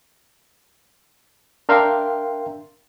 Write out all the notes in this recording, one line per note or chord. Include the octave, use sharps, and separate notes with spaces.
D4 A#4 E5 F5 G5 C6